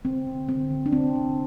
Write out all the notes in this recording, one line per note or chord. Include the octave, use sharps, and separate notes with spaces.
D3 C4
D3
D3 C4
D3
D4
D3 C4
D3